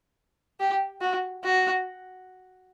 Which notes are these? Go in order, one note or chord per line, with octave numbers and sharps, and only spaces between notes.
G4
F#4
F#4